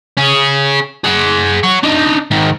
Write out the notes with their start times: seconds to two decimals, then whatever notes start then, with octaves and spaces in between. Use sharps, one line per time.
0.17 C#4 G#4
1.04 G#4 F#5
1.63 C#5 F#5
1.83 D4 D#4
2.31 G#2 D#3